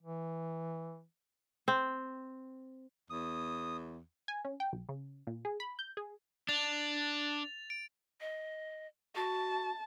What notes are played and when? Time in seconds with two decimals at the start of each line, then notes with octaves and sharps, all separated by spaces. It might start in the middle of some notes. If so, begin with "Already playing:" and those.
0.03 E3
1.68 C4
3.10 E2 D#6
4.28 G#5
4.45 C#4
4.60 G5
4.73 B1
4.89 C#3
5.27 A#2
5.45 G#4
5.60 B5
5.79 G6
5.97 G#4
6.49 D4 A6 F7
7.70 D7
8.21 D#5
9.15 F#4 A5